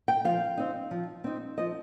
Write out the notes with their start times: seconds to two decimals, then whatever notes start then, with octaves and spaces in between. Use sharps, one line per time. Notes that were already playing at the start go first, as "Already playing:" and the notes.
0.08 G5
0.25 F3 F5
0.58 C4 D#4
0.91 F3
1.24 C4 D#4
1.58 F3 D#5